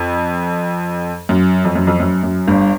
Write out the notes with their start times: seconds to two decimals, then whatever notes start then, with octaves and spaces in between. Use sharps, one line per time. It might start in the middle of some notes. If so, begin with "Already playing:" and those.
Already playing: F2
1.29 F#2
1.65 F2
1.75 F#2
1.87 F2
2.00 F#2
2.23 F#2
2.48 G1 G2